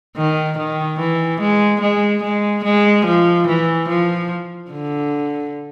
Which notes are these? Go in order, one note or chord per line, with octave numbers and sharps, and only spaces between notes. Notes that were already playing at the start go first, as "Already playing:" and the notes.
D#3
D#3
E3
G#3
G#3
G#3
G#3
F3
E3
F3
D3